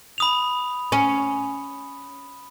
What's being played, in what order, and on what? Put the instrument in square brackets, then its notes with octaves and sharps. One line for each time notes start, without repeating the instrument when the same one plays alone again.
[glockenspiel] B5 D#6 F7
[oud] C#4